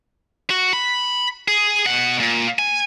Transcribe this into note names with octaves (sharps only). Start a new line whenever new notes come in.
F#4
B5
G#4
B2 F#5
A#2
G#5